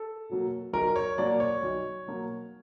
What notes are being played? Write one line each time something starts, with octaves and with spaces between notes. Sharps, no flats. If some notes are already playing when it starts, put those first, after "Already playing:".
Already playing: A4
B2 F#3 A#3
B1 A#4
C#5
B2 F#3 A#3 D5
C#5
B1
B2 F#3 A#3